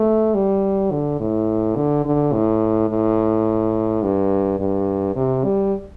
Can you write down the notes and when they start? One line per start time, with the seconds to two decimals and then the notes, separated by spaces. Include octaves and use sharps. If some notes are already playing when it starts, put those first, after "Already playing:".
Already playing: A3
0.35 G3
0.91 D3
1.20 A2
1.76 D3
2.05 D3
2.33 A2
2.89 A2
4.03 G2
4.59 G2
5.16 C3
5.44 G3